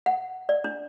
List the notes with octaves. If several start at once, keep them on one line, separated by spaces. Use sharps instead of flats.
F#5
D5
D4